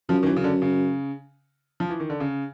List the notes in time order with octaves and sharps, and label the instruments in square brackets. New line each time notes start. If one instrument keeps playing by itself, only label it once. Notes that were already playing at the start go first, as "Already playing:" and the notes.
[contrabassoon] F#2 [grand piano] F3
[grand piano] D#3
E3
C#3
D3
C#3
F3
E3
D#3
D3
C#3